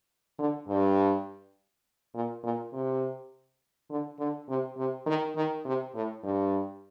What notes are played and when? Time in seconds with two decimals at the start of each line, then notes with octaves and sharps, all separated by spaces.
0.39 D3
0.68 G2
2.14 A#2
2.43 A#2
2.73 C3
3.90 D3
4.19 D3
4.48 C3
4.77 C3
5.06 D#3
5.36 D#3
5.65 C3
5.94 A2
6.24 G2